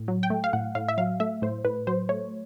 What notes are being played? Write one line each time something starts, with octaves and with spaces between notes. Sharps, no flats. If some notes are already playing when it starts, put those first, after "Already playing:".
Already playing: A2
F#3
G5
A3
F5
A2 F#5
A2 F5
E5
F#3 F5
A3 E5
A2 C5
A2 B4
F#3 C5
A3 C#5